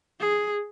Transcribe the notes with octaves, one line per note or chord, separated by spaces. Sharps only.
G#4